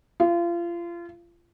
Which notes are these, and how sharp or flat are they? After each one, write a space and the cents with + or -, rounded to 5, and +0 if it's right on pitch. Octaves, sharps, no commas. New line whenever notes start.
F4 -30